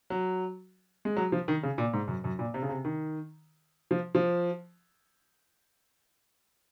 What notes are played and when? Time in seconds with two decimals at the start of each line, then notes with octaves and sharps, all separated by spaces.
0.10 F#3
1.05 G#3
1.16 F#3
1.32 F3
1.48 D#3
1.63 C#3
1.78 A#2
1.93 G#2
2.08 F#2
2.24 F#2
2.39 A#2
2.54 C3
2.62 C#3
2.69 C3
2.85 D#3
3.91 F3
4.15 F3